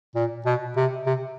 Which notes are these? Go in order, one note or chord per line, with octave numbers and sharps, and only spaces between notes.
A#2
B2
C3
C3